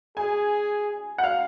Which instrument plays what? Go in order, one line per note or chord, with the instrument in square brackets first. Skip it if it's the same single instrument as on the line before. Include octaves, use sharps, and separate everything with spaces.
[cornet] G#4 [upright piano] G#5
[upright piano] F#5
F5